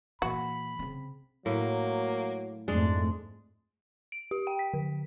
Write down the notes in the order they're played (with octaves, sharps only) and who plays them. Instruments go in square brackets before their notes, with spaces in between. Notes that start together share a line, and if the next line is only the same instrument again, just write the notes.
[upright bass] A#2 E3 [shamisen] F#4 [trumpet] B5
[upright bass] C#3 C4
[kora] A2 [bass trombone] F#3 [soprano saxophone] A#3
[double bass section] F2 G#2 A3 [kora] G#3 [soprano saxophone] D4
[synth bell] D7
G4
G5
B6
D3